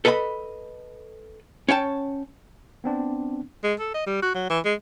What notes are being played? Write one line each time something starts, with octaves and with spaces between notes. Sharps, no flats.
A4 B4 D#5 G#5 B5
C#4 C#5 G5 A5
B3 C4 D4
G#3
A4
D#5
G3
F#4
F#3
E3
G#3